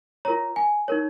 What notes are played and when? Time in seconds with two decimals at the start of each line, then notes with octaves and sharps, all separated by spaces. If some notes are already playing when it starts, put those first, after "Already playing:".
0.25 F4 A#4 C#5 A#5
0.56 G#5
0.88 D#4 A#4 C#5